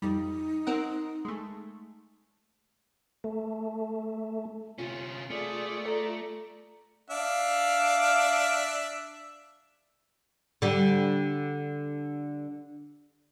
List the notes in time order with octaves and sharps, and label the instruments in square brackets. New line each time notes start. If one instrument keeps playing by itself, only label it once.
[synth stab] F2 G3 [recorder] D#4
[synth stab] C4 A#4 F#5
G#3 A3
[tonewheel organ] A3
[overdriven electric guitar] C3 C#4 [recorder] F4
[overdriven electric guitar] A3 [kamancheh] G#4 D5
[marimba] A4 [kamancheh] D5 A#5
[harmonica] D4 E5 [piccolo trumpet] F5
[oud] D3 G3